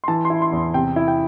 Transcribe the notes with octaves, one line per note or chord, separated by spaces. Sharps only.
C6
E3 A5
C6
E4
C6
E2
C3 G5
E4
G5